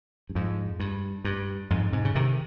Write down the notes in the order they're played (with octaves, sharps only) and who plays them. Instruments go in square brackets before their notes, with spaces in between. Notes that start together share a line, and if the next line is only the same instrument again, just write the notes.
[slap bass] G2
F2 G#2
G2
G2
F2 G#2
G#2 C3
C#3
C3 D#3